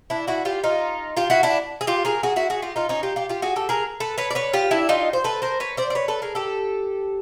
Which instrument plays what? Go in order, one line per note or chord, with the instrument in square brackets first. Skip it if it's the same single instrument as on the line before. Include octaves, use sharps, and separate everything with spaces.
[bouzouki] D4 E4
E4 F#4
F4 G4
D#4 F4
F4 G4
E4 F#4
D4 E4
G#4
F4 G4
G#4 A#4
F#4 G#4
E4 F#4
F#4 G#4
F4 G4
D#4 F4
C#4 D#4
F4 G4
F4 G4
F4 G4
F#4 G#4
G4 A4
G#4 A#4
A4 B4
B4 C#5
D5
B4 C#5
F4 G4
D4 E4
D#4 F4
C5
A4 B4
A#4 C5
B4 C#5
C5 D5
D5
B4 C#5
A4 B4
G#4 A#4
G4 A4